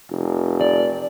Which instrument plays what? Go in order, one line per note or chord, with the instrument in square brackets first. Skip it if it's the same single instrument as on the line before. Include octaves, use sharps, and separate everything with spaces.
[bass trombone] F1
[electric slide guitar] D5